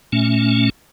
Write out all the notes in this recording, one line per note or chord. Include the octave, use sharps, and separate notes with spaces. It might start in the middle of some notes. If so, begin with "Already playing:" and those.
A#2 A3 C#4